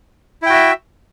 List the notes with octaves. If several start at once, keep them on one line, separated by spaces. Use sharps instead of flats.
E4 F#4 E5 G5